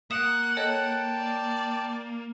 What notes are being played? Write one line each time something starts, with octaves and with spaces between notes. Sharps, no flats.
A#3 F#5 D#6 E7
A4 C#5 D#5 G5 A5
D5